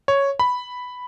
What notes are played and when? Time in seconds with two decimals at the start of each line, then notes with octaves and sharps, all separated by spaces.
0.08 C#5
0.39 B5